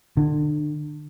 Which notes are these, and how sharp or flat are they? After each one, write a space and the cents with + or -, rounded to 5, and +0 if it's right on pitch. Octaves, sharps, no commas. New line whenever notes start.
D3 +35